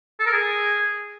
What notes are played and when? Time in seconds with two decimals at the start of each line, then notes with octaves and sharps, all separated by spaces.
0.20 A4
0.26 A#4
0.33 G#4